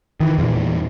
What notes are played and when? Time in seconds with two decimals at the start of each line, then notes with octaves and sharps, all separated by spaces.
0.20 D#3 E3
0.38 E2 A#2